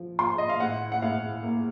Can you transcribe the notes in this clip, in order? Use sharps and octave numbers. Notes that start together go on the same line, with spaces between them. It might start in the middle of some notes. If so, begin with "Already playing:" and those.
Already playing: F3
F4 C6
D#5
F5
A2 F#5
F#5
A2 F5
A#3